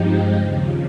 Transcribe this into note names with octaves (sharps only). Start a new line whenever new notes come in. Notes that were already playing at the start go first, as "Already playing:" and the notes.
Already playing: G2 F3 G#3 C4 D#4 G4
D#2 C#3 F3